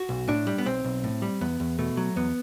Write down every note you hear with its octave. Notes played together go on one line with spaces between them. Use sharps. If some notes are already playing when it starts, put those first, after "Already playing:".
Already playing: F#4
B1
A2 D4
G3
B3
B1 C4
B1
A2
G3
E2 B3
E2
B2 A3
F#3
E2 B3